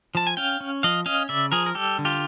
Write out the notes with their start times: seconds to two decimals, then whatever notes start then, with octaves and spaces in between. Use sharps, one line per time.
0.15 F3 A5
0.27 G#5
0.37 C#4 F5 G5
0.61 C#4
0.83 F3 D#5 F5
1.06 C#4 D#5 F5
1.29 C#3 D5 E5
1.52 F3 G#4 A#4
1.66 A#4
1.75 G3 G4 A4
1.98 D3
2.05 F4 G4